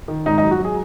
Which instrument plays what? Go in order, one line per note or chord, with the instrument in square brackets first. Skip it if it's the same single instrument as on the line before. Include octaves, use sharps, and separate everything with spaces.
[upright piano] D#3
G#2 D#4
D#4
F#3
F#4
F#3
G#4